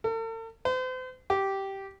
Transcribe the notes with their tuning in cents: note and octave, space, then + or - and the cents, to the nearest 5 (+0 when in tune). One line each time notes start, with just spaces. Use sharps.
A4 +45
C5 -40
G4 -10